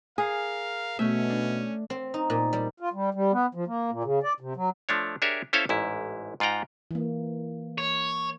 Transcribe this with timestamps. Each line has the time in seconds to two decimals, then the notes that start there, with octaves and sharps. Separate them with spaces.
0.18 G#4 A#4 F5
0.99 B2 A3 C#4 E5
1.30 D4
1.90 C4
2.14 D#4
2.30 A#2
2.53 G3
2.80 F4
2.93 G3
3.14 G3
3.33 B3
3.55 F3
3.67 A#3
3.91 A#2
4.04 C#3
4.23 D5
4.40 C3
4.56 F#3
4.89 F3 A3 D4 C#5
5.22 D4 G4 G#4 A#4 C#5 E5
5.53 C#4 E4 A4 C5 C#5 F5
5.69 A1 G#2 E4
6.40 G#2 F4 F#5 G5 A#5
6.91 E3 A#3
7.78 C#5